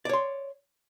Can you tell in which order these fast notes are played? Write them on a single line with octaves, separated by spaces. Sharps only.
D5 C#5 C6